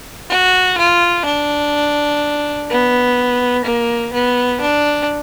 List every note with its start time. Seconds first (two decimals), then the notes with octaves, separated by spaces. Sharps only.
0.29 F#4
0.77 F4
1.26 D4
2.70 B3
3.65 A#3
4.13 B3
4.61 D4